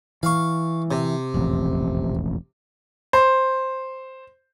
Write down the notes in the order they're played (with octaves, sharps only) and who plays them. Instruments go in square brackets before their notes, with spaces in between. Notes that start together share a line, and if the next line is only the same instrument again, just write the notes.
[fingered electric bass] E3 [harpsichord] F5 C#6
[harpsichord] C3
[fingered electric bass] E1 A1 F2
[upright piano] C5